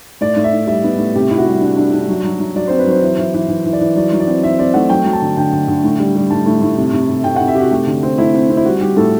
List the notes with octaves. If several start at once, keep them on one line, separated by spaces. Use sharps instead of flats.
A2 D5
A2
E5
A2
G3 E5
B3
A2
C3 G4
C3 E4
F#4
G3
D4
D4
D4
F#3
F#3
F#3
F#3 D5
C4 C5
B4
F#3 C5
E3
E3
E3
E3
E3
D5
E3
F#3 D5
F#3
D5
C4
C4 E5
C4 D5
A3 F#5
F#3 G5
F#3
A5
D3
D3 G5
D3
D3
A2
G3
G3
A2 A5
A2
A2
C3
C3
C3
C3 G5
C3 F#5
E5
C3 F#4 G4
A3 G4
D3
C4
A3 E4
C4
C4
E4
G3 F#4
G3 G4
A2 A4